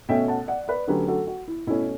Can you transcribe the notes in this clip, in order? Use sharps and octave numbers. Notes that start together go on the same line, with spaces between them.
B2 A3 C#4 E5 G5
F#5 A5
D5 F#5
B4 D5
D3 F#3 A3 C#4 G4 B4
F#4 A4
F#4
E4
B2 A3 C#4 E4